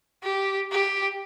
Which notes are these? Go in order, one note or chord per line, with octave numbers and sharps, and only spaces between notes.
G4
G4